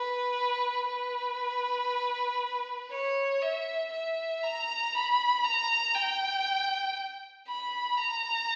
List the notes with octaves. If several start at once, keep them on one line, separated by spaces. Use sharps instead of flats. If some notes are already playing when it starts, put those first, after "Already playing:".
Already playing: B4
B4
C#5
E5
E5
A#5
B5
A#5
G5
B5
A#5